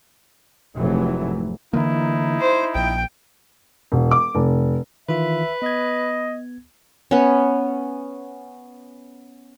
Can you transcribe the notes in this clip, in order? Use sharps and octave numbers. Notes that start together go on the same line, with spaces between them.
F1 G#2 C3 E3 F#3 A3
D3 E3 A#3 D#4 E4
C5
A#1 G5
E1
D6
F1
D#3 E3 F4 B4 E5
B3 D#5 G#6
B3 C#4